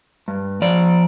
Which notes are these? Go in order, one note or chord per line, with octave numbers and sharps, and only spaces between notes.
G2
F3 D5